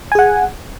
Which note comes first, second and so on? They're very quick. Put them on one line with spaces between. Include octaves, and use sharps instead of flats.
G#5 G#4 F#5